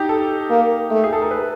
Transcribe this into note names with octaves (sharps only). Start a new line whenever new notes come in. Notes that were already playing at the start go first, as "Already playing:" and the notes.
Already playing: D#4 G4
A4
A#3
A3
G#4
A4
A#4
B4